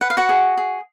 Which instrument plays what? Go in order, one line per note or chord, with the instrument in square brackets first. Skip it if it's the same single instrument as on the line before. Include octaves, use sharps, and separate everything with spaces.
[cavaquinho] B4 F#5
F5
F#4 F#5
G#4
G#4